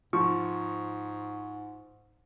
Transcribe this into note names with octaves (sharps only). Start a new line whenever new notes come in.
G#2 F3 C#6